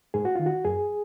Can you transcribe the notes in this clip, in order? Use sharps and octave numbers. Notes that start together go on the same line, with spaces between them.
G#2 G#4
F#4
D#3 F4
F#4
F#2 G#4